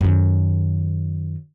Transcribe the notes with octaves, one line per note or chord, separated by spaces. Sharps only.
F#2 D#3